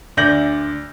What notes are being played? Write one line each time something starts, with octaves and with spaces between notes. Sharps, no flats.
D2 D5 G6 A#6 F#7